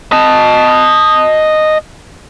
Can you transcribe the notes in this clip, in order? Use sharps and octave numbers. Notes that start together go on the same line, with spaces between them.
D#5 A5